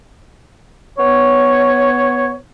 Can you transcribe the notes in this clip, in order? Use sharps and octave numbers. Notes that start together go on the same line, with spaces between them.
B3 C#5